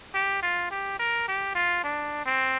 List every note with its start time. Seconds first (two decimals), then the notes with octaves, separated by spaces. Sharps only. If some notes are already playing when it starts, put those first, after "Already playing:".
0.14 G4
0.43 F4
0.71 G4
0.99 A#4
1.28 G4
1.55 F4
1.84 D4
2.26 C4